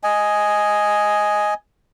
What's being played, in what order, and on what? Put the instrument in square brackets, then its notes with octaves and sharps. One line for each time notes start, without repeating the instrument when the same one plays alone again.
[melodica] D#5 G#5